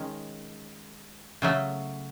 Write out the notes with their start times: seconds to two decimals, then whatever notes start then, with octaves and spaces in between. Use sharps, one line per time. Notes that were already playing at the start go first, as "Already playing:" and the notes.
Already playing: D#3 G#3 C#4
1.42 C#3 F#3 A3